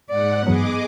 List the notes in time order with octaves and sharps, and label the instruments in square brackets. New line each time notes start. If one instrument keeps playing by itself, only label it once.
[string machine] G#2 F#5 [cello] D5
[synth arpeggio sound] G2 E3 F#3 [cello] B3 [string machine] G#4 D#5 D6